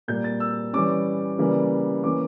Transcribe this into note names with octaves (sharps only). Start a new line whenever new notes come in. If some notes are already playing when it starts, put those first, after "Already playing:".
A#2 G3 A#3 G6
A6
E6
E3 G3 C#4 D6
C#3 E3 G3 A#3
E3 A#3 C#4 D6